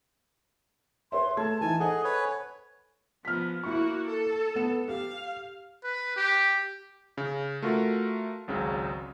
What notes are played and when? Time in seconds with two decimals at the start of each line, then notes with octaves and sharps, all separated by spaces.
1.12 B4 C#5 E5 C6
1.37 A3 A5 G#6
1.61 E3 D#4 G#5
1.80 G#4 A4 C5 D#5 F#5 G#5
2.04 B4 C#5
3.25 F3 B3 F6 B6
3.64 A#3 E4 F#4 C#6
4.07 A4
4.56 B3 B4 E7
4.88 G4 F5
5.84 B4
6.16 G4
7.18 C#3
7.62 A3 F4 F#4 A#4
8.48 G#1 C#2 C#3 F#3